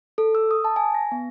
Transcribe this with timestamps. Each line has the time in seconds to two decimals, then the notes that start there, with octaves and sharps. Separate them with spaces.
0.18 A4
0.35 E6
0.51 D#6
0.64 A5
0.76 G#5
0.95 A#6
1.12 B3